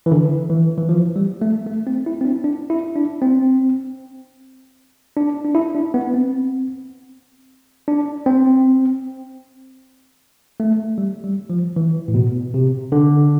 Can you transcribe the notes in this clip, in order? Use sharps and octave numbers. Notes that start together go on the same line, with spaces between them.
E3
D3
E3
E3
F3
G3
A3
A3
C4
E4
C4
D4
D4
E4
D4
C4
D4
D4
E4
D4
B3
C4
D4
C4
A3
G3
G3
F3
E3
A2
B2
C3
D3